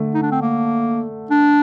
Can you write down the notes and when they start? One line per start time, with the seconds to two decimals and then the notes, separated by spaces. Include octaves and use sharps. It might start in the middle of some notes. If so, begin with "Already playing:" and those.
Already playing: D3 A3
0.14 D#4
0.22 D4
0.31 C4
0.42 A#3
1.30 D4